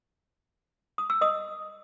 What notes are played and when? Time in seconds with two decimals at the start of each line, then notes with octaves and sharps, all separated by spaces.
0.98 D#6
1.10 E6
1.21 D#5 D#6